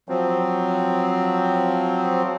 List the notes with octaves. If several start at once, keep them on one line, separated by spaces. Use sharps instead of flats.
F3 F#3 C4